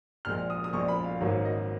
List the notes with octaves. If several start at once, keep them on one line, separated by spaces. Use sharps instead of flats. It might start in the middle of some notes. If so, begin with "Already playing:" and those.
A#1 A#2 G#3 F6
D#6
D#6
A#1 A#2 G#3 C#6
B5
F5
G#1 G#2 F#3 A#3 C#5
D#5